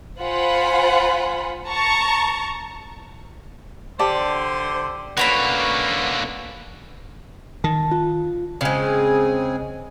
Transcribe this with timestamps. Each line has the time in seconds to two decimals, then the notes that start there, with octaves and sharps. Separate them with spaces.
0.19 F4 C5 F#5 G#5 B5
1.67 A5 A#5 C#6
3.99 D3 G4 C5 D5 A5
5.17 D3 A3 A#3 C#4 F#4 B4 C#5 B5
7.64 D#3 A5
7.91 F4
8.61 C#3 G#3 C4 G#4 G#5